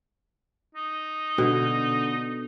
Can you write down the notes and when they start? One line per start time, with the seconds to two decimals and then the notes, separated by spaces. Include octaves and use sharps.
0.75 D#4
1.38 B2 D3